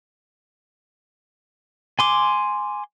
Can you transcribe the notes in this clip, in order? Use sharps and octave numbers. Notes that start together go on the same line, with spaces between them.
G#5 C6 D6